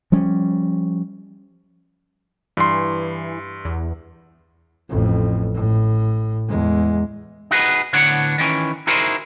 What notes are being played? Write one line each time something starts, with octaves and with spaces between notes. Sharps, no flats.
F3 G3 C#4
G2 E3 C6
E2
A1 F2
A2
E2 G#3
D#4 F#4 G#4 B4
A2 D3 B3 D4 C#5 F#5
D#3 E3 C#4
D#4 E4 F#4 G#4 A#4 C5